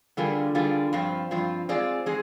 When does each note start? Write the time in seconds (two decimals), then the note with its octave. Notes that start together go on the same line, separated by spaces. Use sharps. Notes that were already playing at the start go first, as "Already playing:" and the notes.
0.17 D3 G3 A#3 F4 G#4
0.55 D3 G3 A#3 F4 G#4
0.93 G2 F3 C4 F4
1.31 G2 F3 C4 F4
1.69 G#3 C4 F4 G#4 D5
2.06 G#3 C4 G#4